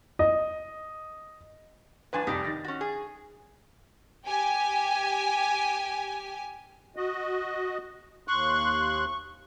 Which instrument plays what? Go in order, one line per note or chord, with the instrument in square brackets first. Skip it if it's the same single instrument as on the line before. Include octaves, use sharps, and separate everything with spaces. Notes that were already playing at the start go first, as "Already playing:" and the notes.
[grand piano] D#5
[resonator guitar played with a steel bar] A2 F3 D4 [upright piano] B4 G#5 A6
[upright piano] C2 F2 [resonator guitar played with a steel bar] D#4 G4 D5
[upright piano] D#3 A6 A#6
[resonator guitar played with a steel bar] C#4 F#4
G#4
[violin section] G4 G#5
[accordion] F#4 D#5
[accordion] D#2 C6 F#6 [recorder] C#6